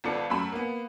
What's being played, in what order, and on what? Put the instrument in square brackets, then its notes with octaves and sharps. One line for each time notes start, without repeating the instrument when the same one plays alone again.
[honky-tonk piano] G#1 B3 F4 A4 D5 C#7
F#2 A3 B5 E7
A#3 B3